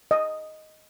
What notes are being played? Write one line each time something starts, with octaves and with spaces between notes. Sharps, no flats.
D#5